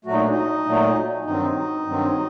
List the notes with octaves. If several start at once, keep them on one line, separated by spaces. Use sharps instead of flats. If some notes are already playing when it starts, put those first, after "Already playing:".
A#2 F#3 A3 F#4
D#4
D4
D#4
A#2 F#3 A3
G2 D#3 F#3 C4 D#4
G2 D#3 F#3 C4